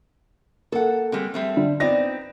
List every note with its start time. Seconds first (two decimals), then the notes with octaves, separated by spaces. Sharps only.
0.72 A#3 A4 F#5
1.12 G3 G#3 C4
1.34 G3 A3 C4
1.57 D3
1.80 B3 C4 D#4 D5 A#6